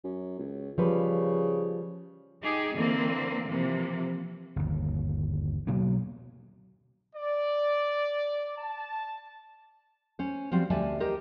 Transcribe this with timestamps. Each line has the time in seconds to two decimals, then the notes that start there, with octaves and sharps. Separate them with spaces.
0.04 F#2
0.39 C#2
0.78 C#3 F3 G3 B4
2.41 D#4 G4 G#4
2.75 D3 E3 A#3 C4
3.47 C3 E3 F3 A#3
4.56 G1 D#2
5.67 B2 F#3 A#3 B3
7.16 D5
8.58 A5
10.19 C#4 C5
10.52 F3 G3 C4 F#4 C5
10.70 D2 G3 D5 E5 G#5 A5
11.00 G4 A#4 C5 D#5